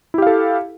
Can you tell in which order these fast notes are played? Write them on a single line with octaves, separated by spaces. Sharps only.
E4 G4 F5 A4